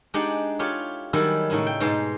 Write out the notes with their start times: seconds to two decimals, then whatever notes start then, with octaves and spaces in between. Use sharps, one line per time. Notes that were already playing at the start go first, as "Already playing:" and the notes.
0.14 G#3 D4 D#4 G4 D5 F#5
0.59 E4 F4 G4 A4 C#5
1.13 D#3 F#3 G3 E4 G#4 A4
1.50 A2 C#3 D#4 E4
1.67 G5
1.80 G#2 B2 G#3 D#4 C5 A5